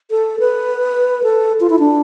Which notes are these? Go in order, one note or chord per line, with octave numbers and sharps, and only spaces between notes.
A4
B4
A4
F4
E4
D4